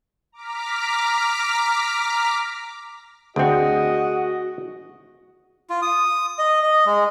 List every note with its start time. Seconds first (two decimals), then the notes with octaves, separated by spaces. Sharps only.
0.32 A#5 D6 F6 B6
3.36 D2 C4 F#4 G#4 D#5 F#5
5.70 F4
5.82 D#6
6.39 D#5
6.63 D#5
6.86 G#3